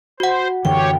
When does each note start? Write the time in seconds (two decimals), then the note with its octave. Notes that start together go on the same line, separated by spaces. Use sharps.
0.20 F#4 C5 F#5
0.65 F#2 D3 E3 G4 C#5 G5